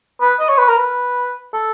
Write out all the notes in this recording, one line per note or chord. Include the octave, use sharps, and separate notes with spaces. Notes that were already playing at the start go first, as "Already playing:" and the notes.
B4
D#5
C#5
B4
A#4
B4
A4